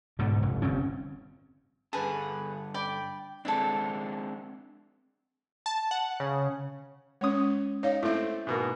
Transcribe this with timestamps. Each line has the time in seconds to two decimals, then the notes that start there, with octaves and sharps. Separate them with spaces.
0.19 G#2 B2 D3
0.43 F1
0.62 G1 G2 C4 C#4
1.93 G2 D3 G#4 B4 A5
2.74 D5 G5 B5
3.45 G#3 C4 D4 E4 A4
5.66 A5
5.91 F#5
6.20 C#3
7.21 G#3 C#4 C#5 D#6
7.83 D#4 C#5 F5
8.03 A3 C4 E4 E5
8.47 G#2 B2 A#3